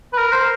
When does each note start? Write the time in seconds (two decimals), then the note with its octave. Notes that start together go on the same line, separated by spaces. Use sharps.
0.13 B4
0.18 A#4
0.32 C5